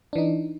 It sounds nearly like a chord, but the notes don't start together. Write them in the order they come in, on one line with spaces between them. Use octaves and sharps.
D4 E3 D#4